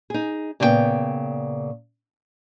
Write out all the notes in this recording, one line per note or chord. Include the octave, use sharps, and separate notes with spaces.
D#4 G#4
A#2 C#3 B3 G#4 G5